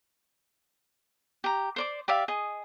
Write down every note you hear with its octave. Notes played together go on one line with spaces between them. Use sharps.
G4 A#5
C5 D5 D6
G4 D5 E5 F5
G#4 D#5